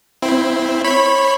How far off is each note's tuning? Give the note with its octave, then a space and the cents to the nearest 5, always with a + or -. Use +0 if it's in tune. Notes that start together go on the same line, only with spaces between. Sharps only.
C4 +0 E4 +0
C#5 -25 B5 +0